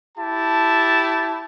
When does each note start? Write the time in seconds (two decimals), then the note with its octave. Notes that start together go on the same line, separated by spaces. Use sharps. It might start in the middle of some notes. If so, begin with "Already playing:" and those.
0.18 E4 G4 A5